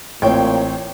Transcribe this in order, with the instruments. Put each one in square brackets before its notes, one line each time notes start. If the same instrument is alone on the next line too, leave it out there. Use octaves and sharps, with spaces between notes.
[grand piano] A1 C4 [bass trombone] A#2 [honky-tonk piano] C#5 G5